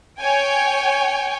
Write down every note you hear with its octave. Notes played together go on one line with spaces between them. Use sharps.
C#5 G5 G#5